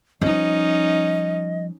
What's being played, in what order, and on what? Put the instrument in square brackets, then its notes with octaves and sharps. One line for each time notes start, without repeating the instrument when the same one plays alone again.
[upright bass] F3 G3 [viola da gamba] C#4 D#4 [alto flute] D#5